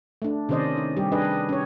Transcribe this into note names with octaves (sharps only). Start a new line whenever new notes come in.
A3 D4
C3 D#3 C#4 C5 D5 D#5
D#4
G3 G4
D4 G#4 B4 D#5
C#4 C#5